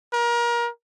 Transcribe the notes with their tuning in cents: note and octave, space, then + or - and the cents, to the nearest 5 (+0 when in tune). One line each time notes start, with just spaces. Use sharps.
A#4 +30